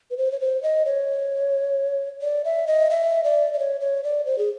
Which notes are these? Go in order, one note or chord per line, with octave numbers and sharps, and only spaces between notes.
B4
C5
C#5
C5
D#5
C#5
D5
E5
D#5
E5
D5
D5
C#5
C#5
D5
C5
G#4